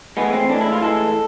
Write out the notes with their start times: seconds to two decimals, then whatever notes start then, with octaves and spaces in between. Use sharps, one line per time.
0.17 A2 E3 G#3 B3
0.33 C4
0.49 A2 E3 G#3 D4
0.61 E4
0.72 F4
0.82 A2 E3 G#3 A4